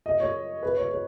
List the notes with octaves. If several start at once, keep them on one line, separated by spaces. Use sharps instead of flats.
D#5
C#5
B4
C#5
C#5